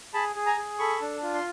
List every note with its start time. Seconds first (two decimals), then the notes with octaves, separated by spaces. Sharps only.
0.14 G#4 A5 B5
0.36 G#4
0.46 G#5 A#5
0.57 G#4
0.79 A4 B5 C#6
1.01 D4
1.22 F4
1.34 C6